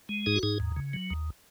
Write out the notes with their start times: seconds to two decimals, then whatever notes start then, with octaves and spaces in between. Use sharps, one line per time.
0.09 G#3
0.26 G#2 D#4 G#4
0.36 F#4
0.43 G#2 D#4 G#4
0.60 D#2
0.76 C#3
0.93 F#3
1.10 D#2